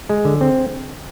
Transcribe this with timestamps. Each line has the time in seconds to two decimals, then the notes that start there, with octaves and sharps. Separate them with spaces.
0.09 G#3
0.25 D3
0.41 C4